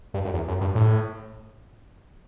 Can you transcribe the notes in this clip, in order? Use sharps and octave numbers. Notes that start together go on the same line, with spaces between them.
G2
F#2
E2
F#2
G2
A2